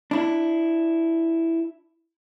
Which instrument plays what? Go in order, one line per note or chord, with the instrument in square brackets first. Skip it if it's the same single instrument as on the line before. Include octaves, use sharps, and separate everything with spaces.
[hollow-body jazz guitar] D4 E4